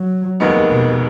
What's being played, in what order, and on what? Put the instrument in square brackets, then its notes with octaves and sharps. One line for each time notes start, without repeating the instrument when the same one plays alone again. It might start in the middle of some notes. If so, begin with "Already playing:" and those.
Already playing: [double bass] F#3
[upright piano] F1 D#2 D#3 G#3 B3
[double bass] B2